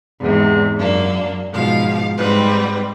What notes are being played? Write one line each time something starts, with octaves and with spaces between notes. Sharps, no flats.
E2 G#2 C3
F#2 A#3 D4
G#2 B2 F3 F5
G#2 G3 C4 B4